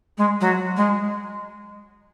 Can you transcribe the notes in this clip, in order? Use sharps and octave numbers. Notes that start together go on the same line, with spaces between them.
G#3
F#3
G#3